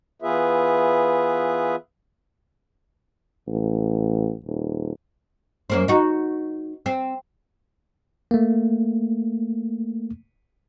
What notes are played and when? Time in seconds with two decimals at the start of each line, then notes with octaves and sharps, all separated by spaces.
0.22 E3 B3 F4 G#4 B4 E5
3.47 A1
4.46 D#1
5.70 F#2 A#3 C5
5.88 D#4 F#4
6.86 C4
8.31 A3 A#3